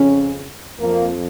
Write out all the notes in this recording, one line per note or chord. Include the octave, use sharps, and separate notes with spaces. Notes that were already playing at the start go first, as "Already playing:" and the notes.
Already playing: F2 C#3 F3 C#4
F2 F3 A#3